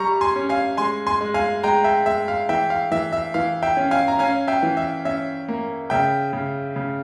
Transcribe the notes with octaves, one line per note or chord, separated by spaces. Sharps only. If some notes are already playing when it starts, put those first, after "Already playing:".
Already playing: G3 A#5 C#6
G#5 C6
C#4
F5 G#5
G#3 G#5 C6
G#5 C6
G#3
F5 G#5
G#3 G5 A#5
E5 G5
G#3 E5
F5
E3 E5 G5
F5
E3 E5
E5
E3 F5
E5 G5
C#4
F5 G#5
A#5
C#4 F5 G#5
E5 G5
E3
E5
C#4 E5
A#3
C#3 E5 G5
C#3
C#3